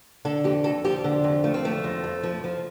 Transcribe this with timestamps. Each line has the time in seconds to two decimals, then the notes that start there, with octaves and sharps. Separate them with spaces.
0.25 D3 A4
0.44 F2 G4
0.64 F2 A4
0.84 F3 G4
1.04 D3
1.24 F2
1.44 F3 A3
1.54 C4
1.64 F3 A3
1.84 F2
2.04 F2
2.23 F3
2.44 F3